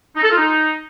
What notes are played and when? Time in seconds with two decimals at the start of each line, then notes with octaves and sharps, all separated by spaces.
0.15 D#4
0.22 A4
0.30 F4
0.37 D#4